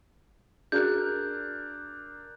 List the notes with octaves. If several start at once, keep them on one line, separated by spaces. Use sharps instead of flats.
D4 F#4 G#4 A#4 F#6 G6